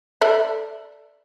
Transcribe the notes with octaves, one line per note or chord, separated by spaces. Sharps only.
A4 D5 E5